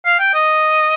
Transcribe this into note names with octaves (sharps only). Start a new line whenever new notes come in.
F5
G5
D#5